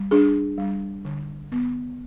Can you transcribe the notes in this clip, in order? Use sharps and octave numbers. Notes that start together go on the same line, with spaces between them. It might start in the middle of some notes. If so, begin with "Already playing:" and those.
Already playing: G3
D4 G#4
G3
D3
B3